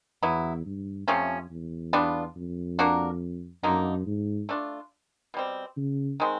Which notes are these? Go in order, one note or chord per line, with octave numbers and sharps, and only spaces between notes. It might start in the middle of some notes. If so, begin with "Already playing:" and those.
E2 F#3 B3 E4
G2
F2 C3 F3 A3 C#4
E2
G3 B3 D4 F4
F2
A#3 D4 F#4 A#4
F#2 D3 F#3 A#3 D#4
G#2
A3 D4 F4
B2 G3 C4
C#3
D#3 G#3 C4